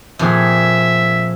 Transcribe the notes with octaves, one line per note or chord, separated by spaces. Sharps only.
F2 A#2 G#4 E5